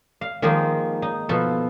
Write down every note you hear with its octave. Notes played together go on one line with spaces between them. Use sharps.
F5
D#3 F3 G#3 A#3 D#4
D#4
B2 F3 A4